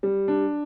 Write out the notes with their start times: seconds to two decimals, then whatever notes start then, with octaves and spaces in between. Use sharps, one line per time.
0.03 G3
0.28 D4